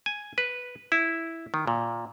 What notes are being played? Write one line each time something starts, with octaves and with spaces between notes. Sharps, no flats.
G#5
B4
E4
D#3
A#2